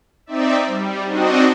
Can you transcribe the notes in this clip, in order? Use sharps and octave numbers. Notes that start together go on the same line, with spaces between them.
C4 D#4 D5 E5
G3
C4 D4 D#4 F#4 D#5